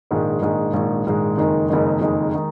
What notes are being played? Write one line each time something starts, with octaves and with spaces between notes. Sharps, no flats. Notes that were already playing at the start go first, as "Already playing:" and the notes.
A#1 G#2 D#3 G#3
A#1 G#2 D#3 G#3
A#1 G#2 D#3 G#3
A#1 G#2 D#3 G#3
F#1 F2 D#3 G#3 D#4
F#1 F2 D#3 G#3 D#4
F#1 F2 D#3 G#3 D#4
D#3 G#3 D#4